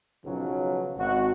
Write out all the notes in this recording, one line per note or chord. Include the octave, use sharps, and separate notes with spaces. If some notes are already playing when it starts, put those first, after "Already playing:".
B1 C#3 F3 F#3
G#1 F#4